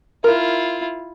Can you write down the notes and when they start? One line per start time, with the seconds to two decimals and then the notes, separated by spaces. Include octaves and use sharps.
0.24 E4 F4 A#4